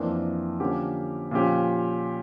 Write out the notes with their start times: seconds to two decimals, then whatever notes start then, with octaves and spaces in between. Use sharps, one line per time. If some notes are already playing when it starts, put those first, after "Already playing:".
Already playing: F2 E3 A#3 D4
0.60 D3 F3 A#3 C#4 G4
1.31 A#2 F3 C#4 G4